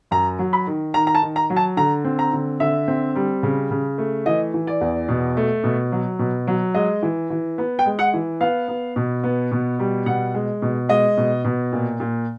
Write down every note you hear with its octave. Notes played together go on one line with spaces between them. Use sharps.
F#2 A#5
F#3
B5
D#3
D#3 A#5
A#5
A5
D#3
A#5
F#3
A5
D3 A#5
C4
A#5
D3
D3 E5
C4
G3
C#3
C#3
A3
E3 D#5
E3
D5
E2
B2
A3
B2
F#3
B2
F#3
G#3 D#5
E3
E3
B3
G5
G#3
F#5
E3
B3 F5
B3
B2
B3
B2
G3
B2 F#5
G#3
B2
G#3 D#5
B2
B2
A#2
A#2